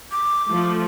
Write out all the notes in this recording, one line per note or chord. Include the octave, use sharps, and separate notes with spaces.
D6
F3 A3